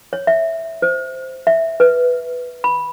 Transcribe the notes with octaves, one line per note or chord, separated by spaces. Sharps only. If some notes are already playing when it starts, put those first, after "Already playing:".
C#5
E5
C5
E5
B4
B5